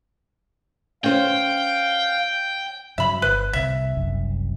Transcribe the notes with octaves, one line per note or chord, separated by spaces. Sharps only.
C#4 C5 F5 G5
G2 C#3 F#3 E5 B5
G1 B4
C2 C3 E5
F#1 C2 F#2